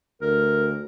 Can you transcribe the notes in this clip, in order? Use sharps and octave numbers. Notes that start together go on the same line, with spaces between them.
D2 A#4